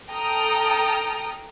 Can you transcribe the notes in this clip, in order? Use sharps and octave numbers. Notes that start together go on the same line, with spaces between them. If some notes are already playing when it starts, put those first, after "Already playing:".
A4 G5 A#5 D#6 F6